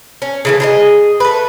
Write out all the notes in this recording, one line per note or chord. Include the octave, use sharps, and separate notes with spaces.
C#4
C#3 E3 A3
G#4 A#4 D#5
A3 B4